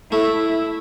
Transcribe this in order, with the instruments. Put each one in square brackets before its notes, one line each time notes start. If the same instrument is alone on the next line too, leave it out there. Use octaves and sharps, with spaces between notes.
[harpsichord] A3 [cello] E4